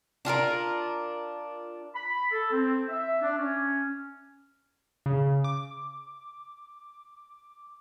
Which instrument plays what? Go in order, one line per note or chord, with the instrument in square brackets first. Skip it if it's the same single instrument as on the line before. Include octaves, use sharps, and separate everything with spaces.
[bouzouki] D4 F4 G#4 A#4
[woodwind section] B5
A4
C4
E5
D4
C#4
[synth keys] C#3
D6